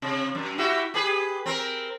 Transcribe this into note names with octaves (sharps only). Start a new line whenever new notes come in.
C3
F#2
E4 F#4 G4
G4 G#4 B4
C4 A#4